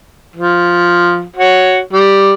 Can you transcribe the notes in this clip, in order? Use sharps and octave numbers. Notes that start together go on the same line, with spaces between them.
F3
F#4 C#5
G3